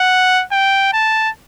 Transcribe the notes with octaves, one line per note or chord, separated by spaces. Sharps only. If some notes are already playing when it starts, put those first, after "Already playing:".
Already playing: F#5
G5
A5